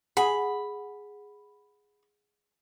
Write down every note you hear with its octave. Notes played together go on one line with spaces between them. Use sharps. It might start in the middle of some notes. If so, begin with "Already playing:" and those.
G#4 F#5 B5